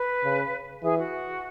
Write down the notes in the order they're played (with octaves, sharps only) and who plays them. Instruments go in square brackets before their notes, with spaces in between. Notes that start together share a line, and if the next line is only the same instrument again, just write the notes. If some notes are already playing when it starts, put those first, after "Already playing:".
Already playing: [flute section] B4
[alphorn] C#3
[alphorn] E3 [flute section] G#4
[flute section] F#4